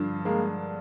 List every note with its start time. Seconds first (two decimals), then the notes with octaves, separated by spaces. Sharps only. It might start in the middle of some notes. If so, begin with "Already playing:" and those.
Already playing: G2 D3 F3
0.25 G#3 A#3